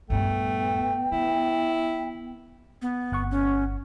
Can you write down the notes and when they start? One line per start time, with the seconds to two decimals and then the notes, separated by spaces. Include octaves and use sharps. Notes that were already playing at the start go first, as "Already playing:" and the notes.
0.10 D#1 G2 A3 B3 G5
1.12 D#3 E4
2.82 B3
3.12 G1 F#5 C#6
3.31 C#4